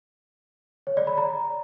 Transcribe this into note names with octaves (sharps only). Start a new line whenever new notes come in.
C#5
D5
B5
A#5